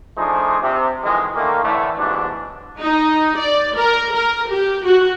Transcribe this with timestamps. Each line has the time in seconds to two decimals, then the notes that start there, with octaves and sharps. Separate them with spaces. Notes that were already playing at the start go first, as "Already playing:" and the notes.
0.17 F3 A3 D4 D#4 G#4 C5
0.63 C3
1.04 F2 D#3 E3 G#3
1.35 D3 D#3 A3 A#3
1.64 A2 D3 E3 A3
1.98 A1 G#2 B2 E3 D4
2.80 D#4
3.39 D5
3.76 A#4
4.15 A#4
4.51 G4
4.85 F#4